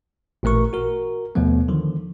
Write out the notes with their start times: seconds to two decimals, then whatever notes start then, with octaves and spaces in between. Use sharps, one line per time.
0.43 A1 A#2 A3 A#4 C#6
0.73 F#4 A#4
1.35 D#2 B2 F3 A3 B3
1.68 D3 D#3 F3